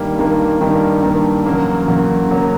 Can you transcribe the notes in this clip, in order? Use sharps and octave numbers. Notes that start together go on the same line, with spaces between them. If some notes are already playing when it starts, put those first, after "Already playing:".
Already playing: G2 D#3 G3 A#3
G2 D#3 G3 A#3
G2 D#3 G3 A#3
G2 D#3 G3 A#3
E2 C#3 F#3 A#3
E2 C#3 F#3 A#3
E2 C#3 F#3 A#3